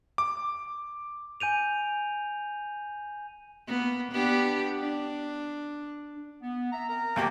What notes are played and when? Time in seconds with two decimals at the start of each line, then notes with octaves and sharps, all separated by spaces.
0.18 D6
1.40 G#5 G6 D#7 F7
3.68 A#3 B3
4.12 B3 D4 G4
4.79 D4
6.42 B3
6.72 E5 A#5
6.88 C4 A#4 A#5
7.16 D2 A#3 G4